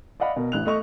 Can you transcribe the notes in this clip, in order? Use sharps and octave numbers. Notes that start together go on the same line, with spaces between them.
D5 D#5 F5 F#5 B5
B2 A#4
A1 F#6 F7
A3 D#5 C#6 F7